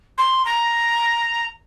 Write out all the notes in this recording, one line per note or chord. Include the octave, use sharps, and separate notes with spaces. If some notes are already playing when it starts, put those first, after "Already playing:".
C6
A#5